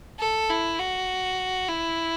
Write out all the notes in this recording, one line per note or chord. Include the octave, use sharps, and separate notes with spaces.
A4
E4
F#4
E4